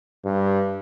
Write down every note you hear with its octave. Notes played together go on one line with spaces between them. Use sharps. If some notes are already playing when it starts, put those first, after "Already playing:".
G2